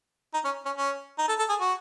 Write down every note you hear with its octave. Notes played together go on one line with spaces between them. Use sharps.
D#4
C#4
C#4
C#4
D#4
A4
A4
G#4
F#4